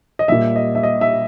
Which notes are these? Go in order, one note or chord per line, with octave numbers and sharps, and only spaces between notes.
D#5
A#2 G3 E5
D#5
E5
D#5
E5